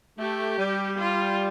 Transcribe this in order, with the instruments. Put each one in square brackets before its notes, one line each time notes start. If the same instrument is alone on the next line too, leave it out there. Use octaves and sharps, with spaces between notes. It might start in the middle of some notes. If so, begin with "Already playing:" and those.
[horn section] A3 [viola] G4
[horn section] G3
[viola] F4